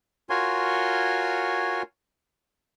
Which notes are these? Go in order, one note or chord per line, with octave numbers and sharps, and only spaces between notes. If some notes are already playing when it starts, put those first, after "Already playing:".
F4 F#4 A#4 C#5 G#5 C6